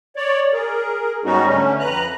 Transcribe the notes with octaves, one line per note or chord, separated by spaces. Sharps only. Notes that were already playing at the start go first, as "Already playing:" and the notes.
C#5 D5
G#4 A#4
G#2 G3 B3 C#4 D#4 F#4
D3 A3 C#4
F2 B4 A#5 F#6